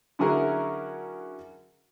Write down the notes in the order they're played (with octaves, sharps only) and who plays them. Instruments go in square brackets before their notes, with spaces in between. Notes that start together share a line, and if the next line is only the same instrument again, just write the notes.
[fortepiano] D3 F#3 C#4 E4 G#4 A#4